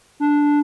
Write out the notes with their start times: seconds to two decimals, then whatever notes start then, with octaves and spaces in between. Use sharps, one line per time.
0.20 D4